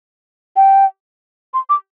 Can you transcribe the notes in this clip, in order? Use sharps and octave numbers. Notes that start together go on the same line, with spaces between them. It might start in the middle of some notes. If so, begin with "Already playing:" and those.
G5
C6
D6